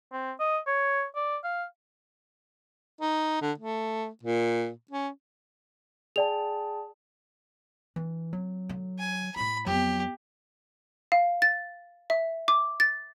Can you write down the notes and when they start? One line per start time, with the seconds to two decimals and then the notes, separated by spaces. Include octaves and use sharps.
0.12 C4
0.40 D#5
0.67 C#5
1.15 D5
1.44 F5
3.01 D#4
3.42 D3
3.58 A3
4.23 A#2
4.91 C#4
6.16 G#4 D5 G5 A5 F7
7.96 E3 D4
8.33 F#3 C4
8.69 D3
8.99 G#5
9.36 A2 A3 B5
9.66 F2 F#3 B3 G4
11.12 F5
11.42 A6
12.10 E5
12.48 D6
12.80 A6